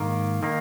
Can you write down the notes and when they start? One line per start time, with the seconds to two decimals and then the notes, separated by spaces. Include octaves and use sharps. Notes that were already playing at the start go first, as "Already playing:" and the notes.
Already playing: G#2 D#3 A#3
0.43 D#3 A#3